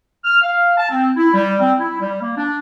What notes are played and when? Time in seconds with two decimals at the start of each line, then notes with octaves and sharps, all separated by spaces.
0.25 F6
0.42 F5
0.78 A5
0.90 C4
1.17 E4
1.34 G3
1.60 C4
1.79 E4
2.01 G3
2.21 A#3
2.37 D4